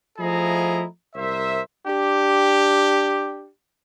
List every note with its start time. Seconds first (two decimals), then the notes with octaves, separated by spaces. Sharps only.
0.19 F3 A3 E4 G#4 D#5 A#5
1.15 C2 A#4 C5 E5
1.86 D4 G4